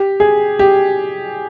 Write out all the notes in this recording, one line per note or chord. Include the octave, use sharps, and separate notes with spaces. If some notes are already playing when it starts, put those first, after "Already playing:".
Already playing: G4
G#4
G4